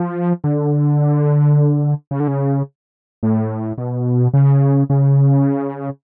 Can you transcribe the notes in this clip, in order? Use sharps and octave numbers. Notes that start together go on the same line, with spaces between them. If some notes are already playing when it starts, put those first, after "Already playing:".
Already playing: F3
D3
C#3
D3
C#3
A2
B2
C#3
C#3